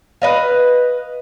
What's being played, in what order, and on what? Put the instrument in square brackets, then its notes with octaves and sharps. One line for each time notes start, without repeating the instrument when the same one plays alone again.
[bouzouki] B4 D#5 F5